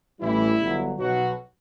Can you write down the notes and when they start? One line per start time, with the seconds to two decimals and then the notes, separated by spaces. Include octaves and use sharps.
0.21 A1 A2 E3 G3 E4
0.60 G1 G2 F#3
0.99 B1 B2 F#3 F#4